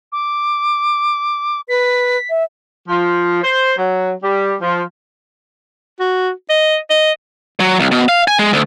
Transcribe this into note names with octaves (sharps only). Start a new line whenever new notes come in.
D6
B4 B6
E5
F3
C5
F#3
G3
F3
F#4
D#5
D#5
F#3
C2
B2
F5
G#5
G#3
D2